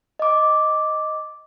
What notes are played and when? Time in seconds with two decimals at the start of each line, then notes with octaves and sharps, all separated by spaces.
0.19 D#5 D6